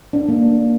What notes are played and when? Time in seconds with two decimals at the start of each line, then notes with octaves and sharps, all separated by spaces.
0.13 D4
0.29 A#3